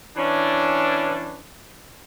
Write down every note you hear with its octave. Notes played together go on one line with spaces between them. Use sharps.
E3 C#4 D4